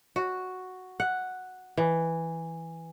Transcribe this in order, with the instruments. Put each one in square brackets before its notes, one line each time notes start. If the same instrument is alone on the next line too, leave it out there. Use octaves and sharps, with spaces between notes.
[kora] F#4
F#5
E3